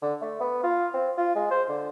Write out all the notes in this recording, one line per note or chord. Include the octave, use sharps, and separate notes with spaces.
D3
A3
B3
F4
C4
F4
G#3
C5
D3